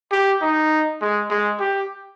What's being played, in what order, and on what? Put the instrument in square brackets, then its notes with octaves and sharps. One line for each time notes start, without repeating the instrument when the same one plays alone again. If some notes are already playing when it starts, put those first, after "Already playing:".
[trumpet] G4
D#4
G#3
G#3
G4